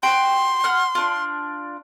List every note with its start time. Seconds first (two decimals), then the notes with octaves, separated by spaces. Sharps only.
0.03 F#4 G4 G5 C6
0.64 F#5 F6 F#6
0.95 D4 F4